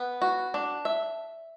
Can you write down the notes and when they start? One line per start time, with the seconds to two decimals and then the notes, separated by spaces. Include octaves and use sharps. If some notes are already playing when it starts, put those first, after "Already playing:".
Already playing: B3
0.22 F#4
0.54 D4
0.85 E5